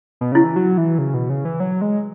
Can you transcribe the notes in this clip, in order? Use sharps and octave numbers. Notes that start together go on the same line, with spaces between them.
B2
C#3 E4
E3
F#3
E3
C#3
B2
C#3
E3
F#3
G#3